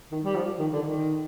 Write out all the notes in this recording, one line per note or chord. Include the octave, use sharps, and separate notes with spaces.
D#3
G3
F3
D#3
D3
D#3